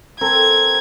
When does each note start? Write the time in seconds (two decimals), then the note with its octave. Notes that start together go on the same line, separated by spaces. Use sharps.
0.21 C4 A4 A#4 G#6